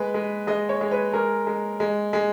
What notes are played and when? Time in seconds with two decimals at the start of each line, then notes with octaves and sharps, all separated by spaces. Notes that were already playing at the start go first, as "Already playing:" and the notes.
Already playing: G#3 B4
0.14 G#3
0.47 G#3 D#5
0.69 C#5
0.81 G#3
0.91 B4
1.13 G#3 A#4
1.47 G#3
1.80 G#3
2.13 G#3